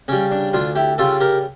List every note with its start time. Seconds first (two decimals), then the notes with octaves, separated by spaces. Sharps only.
0.08 C#3 G3 C#4
0.31 D4
0.53 D2 D4 F4
0.75 E4 G4
0.98 C#3 G3 F4 A4
1.20 G4 A#4